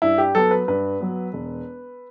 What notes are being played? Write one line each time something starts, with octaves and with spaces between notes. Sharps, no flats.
G2 E4
G4
F#3 B3 A4
B4
G2 B4
F#3 B3
E1